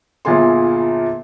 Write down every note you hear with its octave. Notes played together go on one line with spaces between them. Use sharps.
G1 A#2 F4 G#4 C6